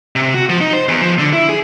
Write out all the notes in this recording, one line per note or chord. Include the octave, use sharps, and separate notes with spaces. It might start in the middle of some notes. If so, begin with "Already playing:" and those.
C3
F#4
F3
D#4
C5
E2
F3
D3
E4
G#4